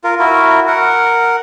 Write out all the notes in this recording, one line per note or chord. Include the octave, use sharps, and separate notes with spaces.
F4 A#4
E4 F#4 A#4
A#4 F#5